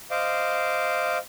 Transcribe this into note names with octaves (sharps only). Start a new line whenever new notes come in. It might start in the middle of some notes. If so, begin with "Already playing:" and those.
C5 D#5 F5 D6